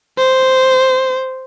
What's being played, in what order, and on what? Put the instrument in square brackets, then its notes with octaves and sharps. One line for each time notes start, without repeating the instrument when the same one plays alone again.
[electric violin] C5